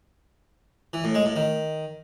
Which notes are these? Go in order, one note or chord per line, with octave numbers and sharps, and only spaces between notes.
E3
A2
G#3
A2
D#3